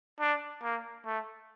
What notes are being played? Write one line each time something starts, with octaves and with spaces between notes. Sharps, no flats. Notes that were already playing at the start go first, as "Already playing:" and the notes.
D4
A#3
A3